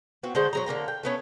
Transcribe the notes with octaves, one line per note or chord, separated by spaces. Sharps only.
B3 C4 F#4
D3 G#3 A3 C5
F#3 G#3 A#5
D3 A#3 C4 A#5
G5
A3 B3 C#4